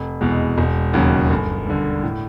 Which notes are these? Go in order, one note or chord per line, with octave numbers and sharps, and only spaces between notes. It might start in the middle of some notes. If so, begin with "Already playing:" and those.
Already playing: F1
E2 B2 G#3
E1
D#2 C#3 F#3
G1
G2 D3
A2